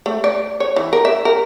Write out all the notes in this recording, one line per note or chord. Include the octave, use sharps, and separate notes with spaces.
A3
D5
C#5
E3
A#4
E5
A#4